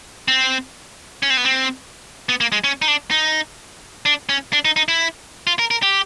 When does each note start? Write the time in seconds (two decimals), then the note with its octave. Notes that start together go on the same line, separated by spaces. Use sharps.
0.28 C4
1.23 C#4
1.30 C4
1.37 B3
1.45 C4
2.29 B3
2.41 A#3
2.52 G#3
2.64 C#4
2.82 D#4
2.88 D4
3.11 D#4
4.06 D4
4.29 C#4
4.53 D4
4.65 D#4
4.76 D#4
4.88 E4
5.47 F4
5.59 A#4
5.71 A#4
5.83 G4